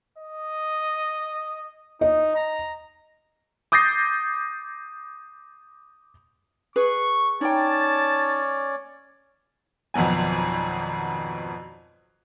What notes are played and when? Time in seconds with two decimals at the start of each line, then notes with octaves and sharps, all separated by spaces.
0.18 D#5
2.01 D#4 D#5
2.35 A#5
3.72 D6 D#6 G6 A6 A#6 C7
6.76 G#4 B4 C#6
7.41 C#4 D#4 C#5 D5 G5 A5
9.94 G#1 F2 B2 F#3 G#5